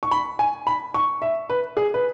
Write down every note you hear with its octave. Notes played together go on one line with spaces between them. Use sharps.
C#6
B5
G#5
B5
C#6
E5
B4
G#4
B4